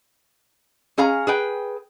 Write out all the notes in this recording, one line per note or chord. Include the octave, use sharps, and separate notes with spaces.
C#4 G#4 F5 A#5
G#4 B4 G5